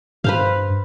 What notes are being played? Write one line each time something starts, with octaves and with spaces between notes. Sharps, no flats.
G2 B4 C5 F5